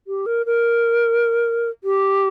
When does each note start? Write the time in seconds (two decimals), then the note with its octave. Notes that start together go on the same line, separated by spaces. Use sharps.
0.07 G4
0.26 A#4
0.46 A#4
1.84 G4